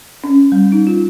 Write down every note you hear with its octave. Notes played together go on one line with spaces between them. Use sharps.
C#4
G3
D#4
F4